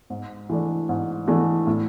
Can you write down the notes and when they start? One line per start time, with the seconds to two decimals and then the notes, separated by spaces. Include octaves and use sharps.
0.10 G#2
0.50 E3 A3 D4
0.89 G#2
1.28 E3 A3 D4
1.67 A2